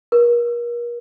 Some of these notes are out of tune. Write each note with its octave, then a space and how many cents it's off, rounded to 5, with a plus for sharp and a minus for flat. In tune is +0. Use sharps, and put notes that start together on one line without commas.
A#4 +35